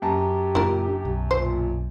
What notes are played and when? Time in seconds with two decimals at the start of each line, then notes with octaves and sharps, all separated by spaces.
0.02 F#2 G4 A5 A#5
0.55 F#1 A#2 D4 E4 A#4
1.05 B1
1.31 A#2 C5